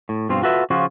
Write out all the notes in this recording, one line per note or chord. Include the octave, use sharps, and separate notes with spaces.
A2
G2 B2 F3 C4 F4
F4 F#4 A4 B4 E5
C#3 F3 C#4 F4 F#4